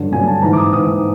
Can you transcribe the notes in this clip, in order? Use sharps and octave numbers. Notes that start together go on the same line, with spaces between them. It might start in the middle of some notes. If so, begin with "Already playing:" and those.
Already playing: G2 D3 F#3
G2 D3 F#3 G#5
A5
G#2 E3 A#5
D6
D#6
G#2 E3 D#6